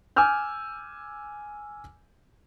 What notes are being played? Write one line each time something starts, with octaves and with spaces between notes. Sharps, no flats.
G#5 D6 E6 F6 G6